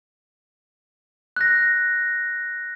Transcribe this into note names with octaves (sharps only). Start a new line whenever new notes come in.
F#6 A#6